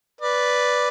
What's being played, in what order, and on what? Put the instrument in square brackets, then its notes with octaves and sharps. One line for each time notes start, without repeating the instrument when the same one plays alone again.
[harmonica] B4 D5